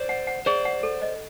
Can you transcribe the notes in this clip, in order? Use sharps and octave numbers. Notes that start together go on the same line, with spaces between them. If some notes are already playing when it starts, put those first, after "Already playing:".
Already playing: C5 D5
F#5
F#5
G#4 C5 D5
F#5
A4
D#5